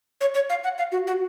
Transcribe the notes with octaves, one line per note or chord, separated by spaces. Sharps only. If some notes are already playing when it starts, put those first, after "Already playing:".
C#5
C#5
F5
F#5
F5
F#4
F#4